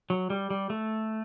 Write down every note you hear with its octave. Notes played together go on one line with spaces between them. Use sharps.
F#3
G3
G3
A3